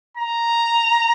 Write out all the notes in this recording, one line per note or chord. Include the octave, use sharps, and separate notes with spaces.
A#5